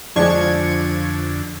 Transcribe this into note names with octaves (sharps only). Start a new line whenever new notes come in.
F2 D3 F3 G#3 D4 C#6 G#6